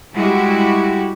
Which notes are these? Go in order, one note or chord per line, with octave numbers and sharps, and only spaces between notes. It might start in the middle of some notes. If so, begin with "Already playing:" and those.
G3 G#3 E4 F#4 G4